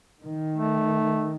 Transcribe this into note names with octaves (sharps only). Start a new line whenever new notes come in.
D#3
A3